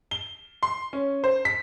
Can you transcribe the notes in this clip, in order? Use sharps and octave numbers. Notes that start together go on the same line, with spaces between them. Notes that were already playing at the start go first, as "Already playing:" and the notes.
G7
C6
C#4
C5
B6